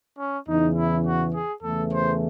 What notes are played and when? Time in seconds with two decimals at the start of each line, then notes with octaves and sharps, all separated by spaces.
0.18 C#4
0.47 E2 C#3 E3 D#4
0.76 E4
1.06 F#4
1.34 G#4
1.63 E2 C#3 E3 A3 A4
1.92 C5